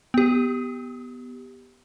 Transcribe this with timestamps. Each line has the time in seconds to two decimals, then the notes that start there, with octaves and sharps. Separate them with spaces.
0.14 B3 G4